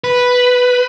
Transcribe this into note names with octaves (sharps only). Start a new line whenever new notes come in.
B4